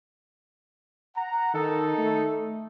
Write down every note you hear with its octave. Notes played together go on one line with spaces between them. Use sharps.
F#5 A#5
D#3 D#4 A4
A3